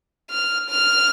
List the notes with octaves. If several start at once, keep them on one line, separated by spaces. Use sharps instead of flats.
F6
F6